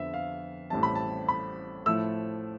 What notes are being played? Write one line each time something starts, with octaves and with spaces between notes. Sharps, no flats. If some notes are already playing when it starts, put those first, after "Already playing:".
Already playing: F2 D3 F3 B3 E5
F5
A1 A2 G3 C4 E4 A5
B5
A5
B5
A2 F3 A3 E4 E6